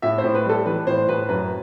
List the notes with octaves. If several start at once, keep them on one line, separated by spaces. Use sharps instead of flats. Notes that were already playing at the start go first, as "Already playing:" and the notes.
A2 E5
C5
A2
B4
G3 A4
E3 B4
A2 C5
A2 B4
F#2 B4